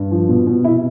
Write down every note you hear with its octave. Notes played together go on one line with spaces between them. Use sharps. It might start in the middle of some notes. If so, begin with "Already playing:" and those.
Already playing: G2
F3
B2
B2
C3 E4